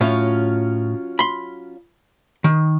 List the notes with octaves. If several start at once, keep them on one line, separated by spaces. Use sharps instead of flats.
A2 F#3 C#4 F4
B5 C6
D#3